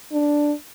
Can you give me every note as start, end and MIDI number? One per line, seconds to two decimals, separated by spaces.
0.12 0.53 62